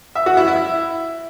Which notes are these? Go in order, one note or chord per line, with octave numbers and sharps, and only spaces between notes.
E5
F#4
E4
E4